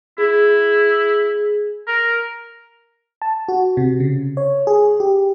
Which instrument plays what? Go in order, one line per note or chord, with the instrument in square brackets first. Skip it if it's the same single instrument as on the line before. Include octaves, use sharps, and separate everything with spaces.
[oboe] E4 [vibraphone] G#4
[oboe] A#4
[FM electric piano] A5
F#4
C3
C#3
C#5
G#4
G4